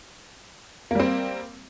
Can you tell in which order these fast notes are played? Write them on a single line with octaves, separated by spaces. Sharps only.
A#3 G3 C4